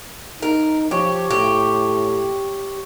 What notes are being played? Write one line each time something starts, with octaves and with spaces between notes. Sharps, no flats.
D#4 A#4
F3 G4 C#5
A2 G4